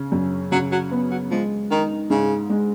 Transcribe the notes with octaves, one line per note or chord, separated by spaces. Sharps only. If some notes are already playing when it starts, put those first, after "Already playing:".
Already playing: C#3
F#2
C#3 F#3
F#3
B3
F#3
F3 G#3
D#3 D#4
G#2 C#3
G#3